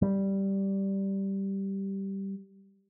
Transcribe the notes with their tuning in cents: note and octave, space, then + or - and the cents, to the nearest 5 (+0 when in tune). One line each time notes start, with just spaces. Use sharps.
G3 -5